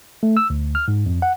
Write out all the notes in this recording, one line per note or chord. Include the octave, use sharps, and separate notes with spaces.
A3
E6
D2
F6
G#2
F2
F#5